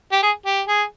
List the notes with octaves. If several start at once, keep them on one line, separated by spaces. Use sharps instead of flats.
G4
G#4
G4
G#4